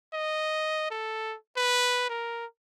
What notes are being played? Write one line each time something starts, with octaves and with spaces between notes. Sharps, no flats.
D#5
A4
B4
A#4